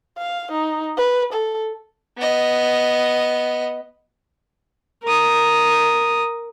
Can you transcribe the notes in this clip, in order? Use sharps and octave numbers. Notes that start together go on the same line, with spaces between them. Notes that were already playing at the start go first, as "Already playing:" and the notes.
F5
D#4
B4
A4
B3 D#5
A#4 D#6